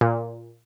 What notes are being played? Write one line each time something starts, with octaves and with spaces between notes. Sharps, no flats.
A#2